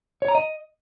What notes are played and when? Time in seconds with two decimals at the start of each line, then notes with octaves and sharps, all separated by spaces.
0.22 C#5
0.28 A#5
0.35 D#5